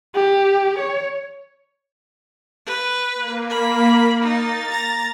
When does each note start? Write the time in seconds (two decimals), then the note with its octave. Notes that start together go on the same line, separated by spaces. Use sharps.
0.15 G4
0.79 C#5
2.67 B4
3.15 A#3
3.50 B5
4.23 D#4 A6
4.72 A#5